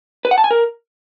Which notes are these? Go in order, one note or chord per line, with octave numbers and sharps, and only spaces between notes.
B4
F#5
A5
G#5
A#4